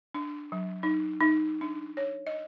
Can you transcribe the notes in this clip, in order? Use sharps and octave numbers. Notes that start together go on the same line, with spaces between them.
D4
F#3
D#4
D#4
D4
C#5
D#5